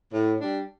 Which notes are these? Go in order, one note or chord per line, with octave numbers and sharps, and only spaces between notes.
A2
G3 D4